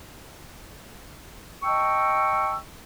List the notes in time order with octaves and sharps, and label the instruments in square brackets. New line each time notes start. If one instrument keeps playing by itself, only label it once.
[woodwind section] D#5 G5 A5 C#6 E6